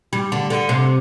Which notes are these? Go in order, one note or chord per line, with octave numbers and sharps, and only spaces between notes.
G3
D3
D3
C3